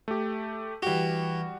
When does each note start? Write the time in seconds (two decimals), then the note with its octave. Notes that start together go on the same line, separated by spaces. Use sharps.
0.08 A3 G4
0.82 E3 G3 F#4 G4